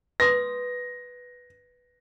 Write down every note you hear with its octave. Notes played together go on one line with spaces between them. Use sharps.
B4 C6 D#6 A#6